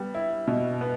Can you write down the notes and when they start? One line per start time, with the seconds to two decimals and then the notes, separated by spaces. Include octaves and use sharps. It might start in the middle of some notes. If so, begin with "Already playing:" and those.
Already playing: G3 B3
0.15 E4
0.47 B2
0.81 B3